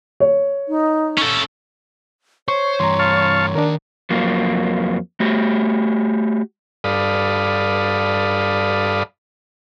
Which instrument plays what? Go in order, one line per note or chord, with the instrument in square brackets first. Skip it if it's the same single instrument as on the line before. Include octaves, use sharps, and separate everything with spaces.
[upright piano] C#5
[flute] D#4
[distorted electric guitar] C#4 A4
[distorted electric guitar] C5 [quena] C#5 [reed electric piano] C#6
[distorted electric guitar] G2 E3 [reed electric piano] A#5 C6
[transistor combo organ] F5 A5 C#6
[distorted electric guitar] D#2 D#3 [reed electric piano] D4 A#4
[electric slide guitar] F2 F#3 A#3 F4
A3 F#4 G4
[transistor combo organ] G2 A4 D5 F5 B5 D#6